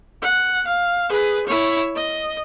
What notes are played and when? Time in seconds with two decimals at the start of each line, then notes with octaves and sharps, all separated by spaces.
0.22 F#5
0.67 F5
1.10 G#4 B4
1.46 E4 C#5
1.96 D#5